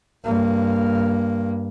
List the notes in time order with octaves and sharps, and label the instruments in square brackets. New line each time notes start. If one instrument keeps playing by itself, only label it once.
[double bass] G2 A#3